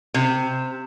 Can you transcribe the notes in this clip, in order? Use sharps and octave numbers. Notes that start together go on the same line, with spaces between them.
C3